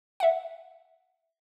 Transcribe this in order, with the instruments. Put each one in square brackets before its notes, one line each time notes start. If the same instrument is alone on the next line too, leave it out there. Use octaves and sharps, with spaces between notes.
[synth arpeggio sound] E5 F#5